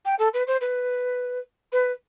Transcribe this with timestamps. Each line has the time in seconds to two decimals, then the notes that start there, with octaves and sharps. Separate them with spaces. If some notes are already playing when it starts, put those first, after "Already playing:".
0.05 G5
0.18 A4
0.33 B4
0.47 C5
0.60 B4
1.72 B4